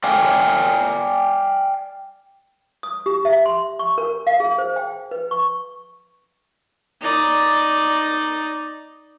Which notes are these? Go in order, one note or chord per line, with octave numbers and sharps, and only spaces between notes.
D5 F5 G5 G#5
D#6
G4
E5
C6
C#6
A#4
F5
G#4
C5
G5
B4
C#6
D#4 D5